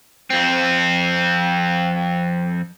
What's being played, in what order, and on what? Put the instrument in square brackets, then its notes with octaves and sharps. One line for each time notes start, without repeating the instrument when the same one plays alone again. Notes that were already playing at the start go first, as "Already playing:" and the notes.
[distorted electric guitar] F2 C4